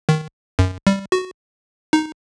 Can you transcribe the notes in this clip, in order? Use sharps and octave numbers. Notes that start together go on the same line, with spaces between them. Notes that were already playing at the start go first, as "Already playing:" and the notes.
D#3
F#2
G3
F#4
D#4